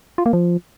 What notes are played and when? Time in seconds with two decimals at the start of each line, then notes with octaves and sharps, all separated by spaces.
0.18 F4
0.26 A#3
0.33 F3